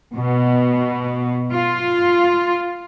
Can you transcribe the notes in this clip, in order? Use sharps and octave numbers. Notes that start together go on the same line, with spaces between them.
B2
F4